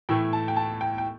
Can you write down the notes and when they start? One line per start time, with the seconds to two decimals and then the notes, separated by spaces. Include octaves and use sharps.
0.09 A2 E3 A3 E4 G5
0.33 A5
0.48 G5
0.56 A5
0.81 G5
0.98 G5